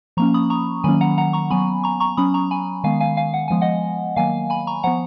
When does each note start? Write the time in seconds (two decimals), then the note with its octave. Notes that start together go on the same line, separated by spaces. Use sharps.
0.17 F3 A#3 C#4 A#5 C#6
0.34 B5 D#6
0.50 A#5 C#6
0.84 D#3 F#3 A#3 C#4 G#5 B5
1.01 F#5 A#5
1.18 F#5 A#5
1.33 A#5 C#6
1.50 F#3 B3 G#5 B5
1.84 A#5 C#6
2.00 A#5 C#6
2.17 F#3 C#4 B5 D#6
2.34 A#5 C#6
2.51 G#5 B5
2.84 D#3 G#3 B3 F5 G#5
3.00 F5 G#5
3.17 F5 G#5
3.34 F#5
3.48 F3 G#3 B3 G#5
3.61 D#5 F#5
4.16 D#3 F#3 A#3 F5 G#5
4.50 G#5 B5
4.67 A#5 C#6
4.83 F3 B3 F#5 A#5